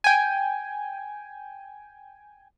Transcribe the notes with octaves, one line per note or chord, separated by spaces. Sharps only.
G5 G#5